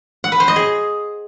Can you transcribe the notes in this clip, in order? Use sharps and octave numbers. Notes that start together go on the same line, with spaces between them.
F#5
B4
C5
D#5
G#4